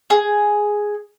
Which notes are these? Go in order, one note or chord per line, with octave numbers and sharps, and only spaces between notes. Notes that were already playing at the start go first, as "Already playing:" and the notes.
G#4